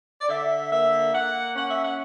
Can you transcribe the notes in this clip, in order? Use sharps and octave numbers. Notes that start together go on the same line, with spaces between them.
D5
D3 E5
A#3 E5
A#3 F#5
C#4 F#5
E5
F#5